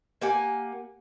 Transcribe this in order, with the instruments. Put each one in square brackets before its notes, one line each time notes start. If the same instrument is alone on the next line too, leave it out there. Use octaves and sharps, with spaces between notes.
[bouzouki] A#3 G4 F#5 G#5